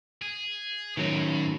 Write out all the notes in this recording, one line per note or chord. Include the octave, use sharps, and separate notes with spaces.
G#4
A2 D#3 F#3 C#4